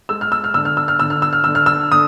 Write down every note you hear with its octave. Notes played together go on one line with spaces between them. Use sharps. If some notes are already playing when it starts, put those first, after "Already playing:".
G#3 E6
F6
E6
F6
D3 E6
F6
E6
F6
D3 E6
F6
E6
F6
D3 E6
F6
E6
D3 D#6